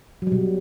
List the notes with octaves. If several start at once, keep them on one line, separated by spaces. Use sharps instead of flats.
B2 F#3 G3